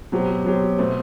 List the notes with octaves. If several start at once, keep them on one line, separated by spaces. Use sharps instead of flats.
B2 F#3 C4 G4
B2 F#3 C4 G4
B2 A3 C4